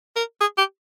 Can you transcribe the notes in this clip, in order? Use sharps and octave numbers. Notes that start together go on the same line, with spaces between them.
A#4
G#4
G4